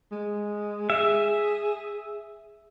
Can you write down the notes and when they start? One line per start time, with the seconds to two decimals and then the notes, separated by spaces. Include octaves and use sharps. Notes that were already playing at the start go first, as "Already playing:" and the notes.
0.12 G#3
0.90 G#4 E5